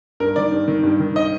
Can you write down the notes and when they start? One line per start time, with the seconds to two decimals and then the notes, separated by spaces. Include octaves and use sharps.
0.20 G2 A#4
0.36 D#3 D5
0.52 G2
0.68 D#3
0.83 G2
1.00 D#3
1.16 D#5